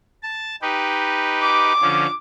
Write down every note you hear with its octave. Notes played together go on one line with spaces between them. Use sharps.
A5
D#4 G4 B4
D6
D3 F3 C#4